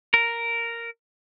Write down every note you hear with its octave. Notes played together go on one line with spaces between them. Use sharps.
A#4